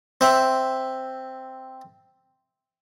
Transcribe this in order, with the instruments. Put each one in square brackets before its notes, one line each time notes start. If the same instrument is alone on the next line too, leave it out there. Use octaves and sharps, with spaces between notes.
[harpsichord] C4 E5